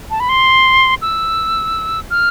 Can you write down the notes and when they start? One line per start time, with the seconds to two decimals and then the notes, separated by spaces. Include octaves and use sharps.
0.11 A5
0.20 B5
0.29 C6
1.02 E6
2.10 F6